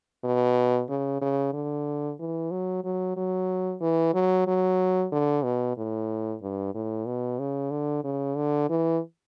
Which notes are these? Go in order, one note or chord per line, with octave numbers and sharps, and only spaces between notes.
B2
C#3
C#3
D3
E3
F#3
F#3
F#3
E3
F#3
F#3
D3
B2
A2
G2
A2
B2
C#3
D3
C#3
D3
E3